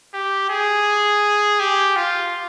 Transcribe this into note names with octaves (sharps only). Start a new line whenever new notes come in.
G4
G#4
G4
F4